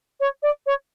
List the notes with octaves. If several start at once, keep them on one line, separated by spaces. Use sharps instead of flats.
C#5
D5
C#5